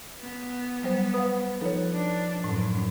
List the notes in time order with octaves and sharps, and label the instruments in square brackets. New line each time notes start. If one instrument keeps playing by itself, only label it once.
[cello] B3
[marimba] F#3 G3 C5
[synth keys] B4 F5 [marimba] F#5 D#6
[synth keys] F3 D#4 B4 [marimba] A4 C#5
[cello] D4
[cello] F#2 F#3 [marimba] A2